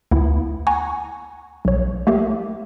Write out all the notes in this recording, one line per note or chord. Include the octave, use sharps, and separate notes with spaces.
D2 B3 E4
F#5 G#5 A#5 C#6
B1 C#5
A3 A#3 G4 E5